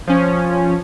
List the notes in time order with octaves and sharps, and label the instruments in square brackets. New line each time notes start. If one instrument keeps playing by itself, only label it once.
[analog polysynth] F3 C#4